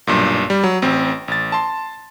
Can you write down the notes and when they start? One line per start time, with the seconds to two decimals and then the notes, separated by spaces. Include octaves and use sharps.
0.07 B1 G2 A#2
0.50 G3
0.64 F#3
0.82 A1 C4
1.28 A1 A6
1.52 A5 C6